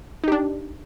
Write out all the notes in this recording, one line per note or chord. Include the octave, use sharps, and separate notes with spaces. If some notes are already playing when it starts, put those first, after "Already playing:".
D4 D#4 G4